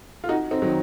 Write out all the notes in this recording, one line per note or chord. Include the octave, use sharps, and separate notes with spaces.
F4
D#4 F#4
C4 D#4
D#3 F#3